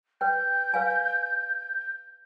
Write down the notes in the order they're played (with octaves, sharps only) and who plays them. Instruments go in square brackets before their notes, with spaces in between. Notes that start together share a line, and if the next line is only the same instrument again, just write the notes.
[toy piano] B4 G5 [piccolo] G6
[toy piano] B4 F5 G#5